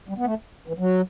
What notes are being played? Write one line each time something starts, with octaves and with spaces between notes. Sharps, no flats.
G3
B3
A3
E3
F#3